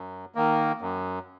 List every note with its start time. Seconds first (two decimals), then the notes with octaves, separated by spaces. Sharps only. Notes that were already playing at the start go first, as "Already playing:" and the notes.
Already playing: F#2
0.35 D#3 A#3
0.81 F#2